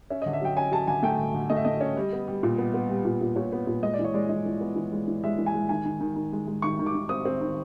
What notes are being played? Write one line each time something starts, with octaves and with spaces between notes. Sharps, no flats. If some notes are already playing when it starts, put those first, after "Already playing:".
C#4 E5
D3 D#5
E5
F#3 G5
C#4 G#5
F#3 A5
D3 G#5
A3 G5
D3
D3
A3 D#5
E5
A3 D#5
C#4
G3
B3
G3
A#2
B3
B3
G3
A#2
A#2
A#2 C#5
B3
A#2
G#3 D#5
D5
E3
C#5
G#3 D5
E3 D#5
E3
B3
E3
G#3
E3
G#3 E5
E3
G#5
G#3
D#3 G#5
D#3
D#3
D#3
G#3
G#3
D#3 C#6
D#3
D6
D#3
C4 D#6
C4
D#3